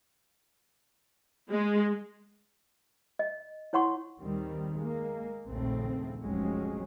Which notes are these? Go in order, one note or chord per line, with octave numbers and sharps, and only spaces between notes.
G#3
D#5
E4 C#5 F#5 C6 C#6
D#2 D#3 G3 C4
G#3 A#3
A#1 D#2 C#3 A3 C4
F1 F#3 G#3 C4 C#4